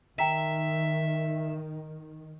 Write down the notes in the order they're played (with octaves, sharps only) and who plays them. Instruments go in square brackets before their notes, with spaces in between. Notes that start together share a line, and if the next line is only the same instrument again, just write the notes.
[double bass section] D#3 [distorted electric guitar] E5 [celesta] G5 A#5 B6